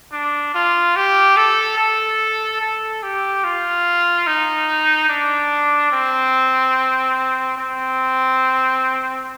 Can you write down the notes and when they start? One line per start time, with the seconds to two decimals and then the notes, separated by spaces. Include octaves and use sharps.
0.12 D4
0.55 F4
0.96 G4
1.37 A4
1.78 A4
2.61 A4
3.03 G4
3.44 F4
4.27 D#4
5.09 D4
5.92 C4
7.58 C4